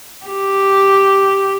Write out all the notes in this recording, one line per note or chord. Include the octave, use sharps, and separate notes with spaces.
G4